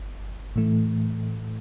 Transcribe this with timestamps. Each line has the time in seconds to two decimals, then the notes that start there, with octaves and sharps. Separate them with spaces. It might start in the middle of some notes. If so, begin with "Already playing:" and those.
Already playing: G1
0.56 A2 E3 A3